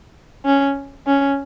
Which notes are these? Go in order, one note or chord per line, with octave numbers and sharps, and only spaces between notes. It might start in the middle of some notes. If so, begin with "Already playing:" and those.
C#4
C#4